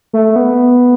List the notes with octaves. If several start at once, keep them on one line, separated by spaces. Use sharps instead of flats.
A3
B3